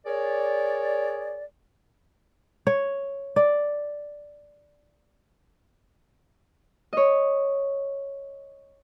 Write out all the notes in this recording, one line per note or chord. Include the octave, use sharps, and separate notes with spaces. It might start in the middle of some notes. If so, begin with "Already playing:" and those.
G#4 A#4 C#5 D5
C#5
D5
C#5 D#5